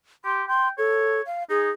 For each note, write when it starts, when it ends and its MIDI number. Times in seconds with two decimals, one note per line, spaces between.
0.25 0.43 67
0.25 0.46 84
0.48 0.71 79
0.48 0.68 84
0.78 1.22 69
0.78 1.22 73
1.26 1.44 77
1.50 1.70 63
1.50 1.71 68